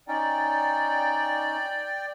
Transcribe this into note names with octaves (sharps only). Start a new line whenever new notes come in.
C#4 D#4 D5 G5